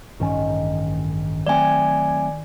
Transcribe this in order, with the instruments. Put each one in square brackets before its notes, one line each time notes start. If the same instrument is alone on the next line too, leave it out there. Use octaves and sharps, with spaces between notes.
[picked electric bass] A1 G2 C#4 [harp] D#3
[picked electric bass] F#3 A3 C4 [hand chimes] D5 G#5